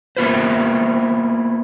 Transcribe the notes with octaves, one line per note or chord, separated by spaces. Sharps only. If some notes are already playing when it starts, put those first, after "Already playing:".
A#3 B3 E4 F4 B4 C5